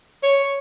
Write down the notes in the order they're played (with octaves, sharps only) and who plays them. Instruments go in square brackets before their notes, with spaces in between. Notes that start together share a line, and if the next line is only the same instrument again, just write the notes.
[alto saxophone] C#5